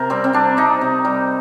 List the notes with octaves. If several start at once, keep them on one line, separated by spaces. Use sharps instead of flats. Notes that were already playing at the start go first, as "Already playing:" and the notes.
Already playing: C3 A#4 C5
G3 C4
C4
G3 D4
C3 D#4
C3
G3